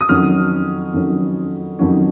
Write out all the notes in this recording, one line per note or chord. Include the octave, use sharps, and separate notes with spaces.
D#6
F2 D#3 F#3 C#4 F6
F2 D#3 F#3 C#4
F2 D#3 F#3 C#4